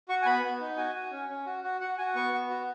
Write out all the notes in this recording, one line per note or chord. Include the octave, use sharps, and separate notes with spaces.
F#4 C#6
G#5
B3 B5
B3
D#4
F#4 G#5
F#4
C#4
C#4
F#4
F#4
F#4 F#5
F#4 G#5
B3 C#6
B3
F#4